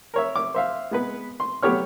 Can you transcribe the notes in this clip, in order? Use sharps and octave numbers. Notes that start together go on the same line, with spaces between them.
A#4 C#5 E5
D6
C5 E5 F5
G#3 B3 B4
C6
F#3 A3 B3 G4 C#5 F6